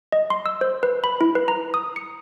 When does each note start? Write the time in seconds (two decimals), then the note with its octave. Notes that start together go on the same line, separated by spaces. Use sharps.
0.12 D#5
0.30 C6
0.46 E6
0.61 C5
0.83 B4
1.04 B5
1.21 E4
1.35 B4
1.48 A#5
1.74 D#6
1.96 C#7